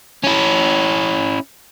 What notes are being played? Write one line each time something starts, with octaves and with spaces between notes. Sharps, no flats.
C#4 E4